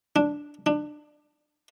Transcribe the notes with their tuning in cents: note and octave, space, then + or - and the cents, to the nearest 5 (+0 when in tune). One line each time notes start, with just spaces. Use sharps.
D4 +0
D4 +25